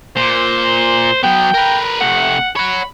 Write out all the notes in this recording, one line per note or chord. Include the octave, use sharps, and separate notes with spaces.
A#2 C5
F#3 B3 G5
A#4 B4
C3 A3 F#5
C#5 F#5 B5